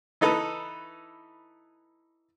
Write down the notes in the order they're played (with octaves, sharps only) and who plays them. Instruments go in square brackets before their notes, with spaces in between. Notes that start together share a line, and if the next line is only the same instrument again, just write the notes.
[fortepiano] E3 D#4 A4 B4